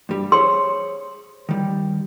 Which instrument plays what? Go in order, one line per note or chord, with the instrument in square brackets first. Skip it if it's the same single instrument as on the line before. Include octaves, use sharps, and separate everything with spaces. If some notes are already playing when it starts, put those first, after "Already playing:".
[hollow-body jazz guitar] G2 G3
[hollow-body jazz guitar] G#4 C5 C#5 [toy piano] C6
[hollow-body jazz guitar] D#3 G3